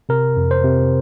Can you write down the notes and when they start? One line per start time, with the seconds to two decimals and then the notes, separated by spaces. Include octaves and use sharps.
0.09 C3 A#4
0.36 F2
0.51 C5
0.64 C3